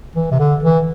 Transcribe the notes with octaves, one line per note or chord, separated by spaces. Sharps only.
E3
C3
D3
E3